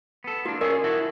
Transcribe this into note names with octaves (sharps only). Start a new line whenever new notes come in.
B3 A4
A#3 D4 F#4
C#4 F4 G#4 A#4 D#5
E4 F#4 A4